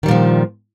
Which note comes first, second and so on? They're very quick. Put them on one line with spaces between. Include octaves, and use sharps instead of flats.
D#3 G3 A#2 F3